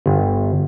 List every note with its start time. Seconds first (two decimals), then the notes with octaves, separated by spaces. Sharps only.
0.06 G1